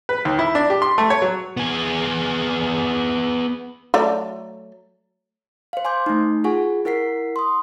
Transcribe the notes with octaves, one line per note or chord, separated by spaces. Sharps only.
B4
D#2
E4
D4
G4
C6
A3
C#5
F#3
B3 G#4
F#3 A3 D5
C5 F5
G#5 C6 D6 G6
A3 D#4
F4 G#4 F#5 G#5 C#6
E4 A#4 F#5 B6 C7
C6 D#6